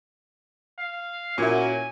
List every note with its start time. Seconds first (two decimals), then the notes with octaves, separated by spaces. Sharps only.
0.79 F5
1.38 A#2 C#4 E4 F#4 A#4 G#5